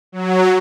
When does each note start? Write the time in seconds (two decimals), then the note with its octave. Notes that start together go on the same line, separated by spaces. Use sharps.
0.12 F#3